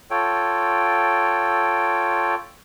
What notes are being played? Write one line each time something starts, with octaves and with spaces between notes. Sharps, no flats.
F4 A4 C#5 G5